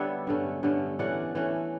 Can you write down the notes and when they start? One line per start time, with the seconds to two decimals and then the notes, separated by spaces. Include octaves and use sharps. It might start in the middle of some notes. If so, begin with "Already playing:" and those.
Already playing: D3 G3 B3 D4 C#5 E5
0.27 G2 D3 A3 C#4
0.63 G2 D3 A3 C#4
0.99 E3 A3 C#4 D5 F#5
1.35 E3 A3 C#4